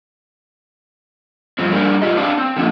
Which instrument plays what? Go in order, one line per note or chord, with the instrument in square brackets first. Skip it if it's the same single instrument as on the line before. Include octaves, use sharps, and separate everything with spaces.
[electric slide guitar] G2 F3 C4
G3 A#3 D4 G#4 A#4
G2 D#4 F4 G4 D#5
C4 D4 D5 F5
C4
D3 F3 G#3 A#3